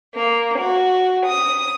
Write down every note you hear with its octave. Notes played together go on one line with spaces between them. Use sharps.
A#3
F#4
D#6